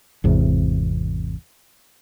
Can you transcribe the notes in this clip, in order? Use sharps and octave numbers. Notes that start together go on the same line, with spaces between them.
G#1 E2 C3